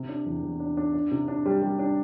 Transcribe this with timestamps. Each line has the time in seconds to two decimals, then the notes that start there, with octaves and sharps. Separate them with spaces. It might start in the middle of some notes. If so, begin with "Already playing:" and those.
Already playing: C3
0.09 D4
0.26 E2
0.43 E2
0.60 D4
0.77 D4
0.94 D4
1.11 C3
1.28 D4
1.46 G3
1.62 G3
1.79 D4